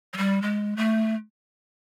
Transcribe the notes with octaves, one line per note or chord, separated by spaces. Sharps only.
F#3
G3
G#3
A3